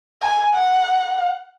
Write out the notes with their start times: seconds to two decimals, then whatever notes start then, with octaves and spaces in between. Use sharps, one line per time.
0.22 G#5
0.54 F#5